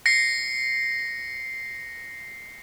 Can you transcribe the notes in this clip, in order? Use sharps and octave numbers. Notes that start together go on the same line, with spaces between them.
A#6 C7 C#7